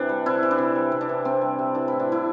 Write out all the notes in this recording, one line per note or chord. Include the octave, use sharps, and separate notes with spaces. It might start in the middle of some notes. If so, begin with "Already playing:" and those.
Already playing: C3 E3 D4
G3
C3 E4
E3
D4
C3
G3
C3
D4
E3
C3 C4
G3
C3
E3 D4
A2 E4
D4
G3 E4